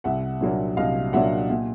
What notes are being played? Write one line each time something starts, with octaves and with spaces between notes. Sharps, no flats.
C2 E5 F#5
A#2 F#3 A#3 D4
C2 D#5 F5
A#2 F#3 A#3 D4 E5 F#5
A#2